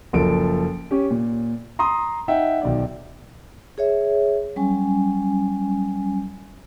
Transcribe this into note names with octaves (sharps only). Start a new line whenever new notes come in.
F#1 F3 A4 D7
C#4 G4
A#2
A#5 C6 D#6
D#4 E5 F#5 G5
B1 D#3 D5
G#4 C#5 E5
F#3 G3 C#4 G#5